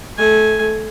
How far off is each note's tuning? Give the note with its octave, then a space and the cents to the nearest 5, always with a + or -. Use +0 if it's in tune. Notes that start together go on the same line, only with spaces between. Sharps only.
A3 -20 G#5 +0